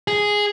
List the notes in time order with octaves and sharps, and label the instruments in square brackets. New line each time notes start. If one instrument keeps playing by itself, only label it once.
[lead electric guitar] G#4